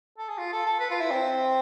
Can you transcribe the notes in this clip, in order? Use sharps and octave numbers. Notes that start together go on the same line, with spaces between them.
A4
G#4
F4
A4
A4
B4
F4
E4
C4